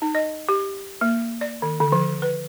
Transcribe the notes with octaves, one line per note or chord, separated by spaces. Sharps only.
D#4
D#5
G4
A#3
D5
D#3
D3
F3
B4